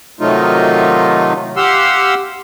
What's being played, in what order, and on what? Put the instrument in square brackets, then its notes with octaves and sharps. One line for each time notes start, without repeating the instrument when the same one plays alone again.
[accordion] C3 D#3 F#3 A3 D#4 F4
G4 F5 F#5 C6 E6